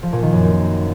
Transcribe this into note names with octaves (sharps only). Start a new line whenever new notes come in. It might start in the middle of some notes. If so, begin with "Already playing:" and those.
F3
A#2
D#3
F#2
C4